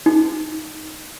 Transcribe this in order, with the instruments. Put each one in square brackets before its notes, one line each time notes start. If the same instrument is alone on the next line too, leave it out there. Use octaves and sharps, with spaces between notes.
[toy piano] D#4